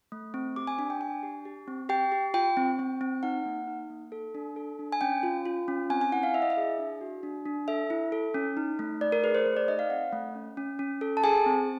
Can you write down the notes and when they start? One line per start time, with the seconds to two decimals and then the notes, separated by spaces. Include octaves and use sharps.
0.12 A3
0.34 C4
0.56 G4 D6
0.67 G#5
0.78 D4 G#5
0.90 G5
1.01 D4 G#5
1.23 G4
1.45 G4
1.68 C4
1.89 G4 G5
2.12 G4
2.34 F4 G5
2.57 C4
2.79 C4
3.01 C4
3.23 D#4 F#5
3.46 A#3
3.67 D#4
3.90 A#3
4.12 A4
4.35 D4
4.56 A4
4.79 D4
4.92 G#5
5.01 C#4 G5
5.23 F4
5.45 F4
5.68 C#4
5.90 C4 G#5
6.01 G#5
6.12 E4 F#5
6.23 F5
6.34 E4 E5
6.42 D#5
6.50 E5
6.57 G#4
6.79 D4
7.01 F#4
7.23 D4
7.46 D4
7.68 A4 E5
7.90 E4
8.12 A4
8.34 C#4
8.57 D#4
8.79 A3
9.01 A3 D5
9.12 A#4
9.23 G#4 B4
9.35 C5
9.46 A3
9.57 D5
9.68 D#4 D#5
9.79 F5
9.90 C4 F#5
10.13 A3
10.35 C#4
10.57 C#4
10.79 C#4
11.01 A4
11.17 A5
11.24 G#4 G#5
11.46 C4